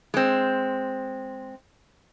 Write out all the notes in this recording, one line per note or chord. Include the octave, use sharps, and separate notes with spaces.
G#3 C4